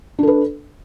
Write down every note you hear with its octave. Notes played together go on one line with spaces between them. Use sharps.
D4 A4 B4